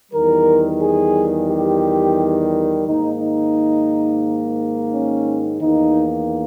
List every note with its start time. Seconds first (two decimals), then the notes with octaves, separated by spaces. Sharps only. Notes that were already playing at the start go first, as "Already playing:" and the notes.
0.12 E2 D#3 G3 A#4
0.81 G#4
1.50 G4
2.86 G#2 D#3 A#3 D#4
3.21 D#4
4.92 C#4
5.61 E2 D#3 A#3 D#4